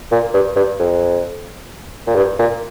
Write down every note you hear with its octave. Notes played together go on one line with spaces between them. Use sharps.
A#2
G2
G2
F2
A#2
G2
A#2